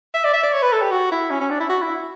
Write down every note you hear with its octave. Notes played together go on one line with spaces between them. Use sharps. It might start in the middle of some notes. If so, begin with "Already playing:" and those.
E5
D5
E5
D5
C#5
B4
A4
G4
F#4
E4
C#4
C#4
D4
E4
F#4
E4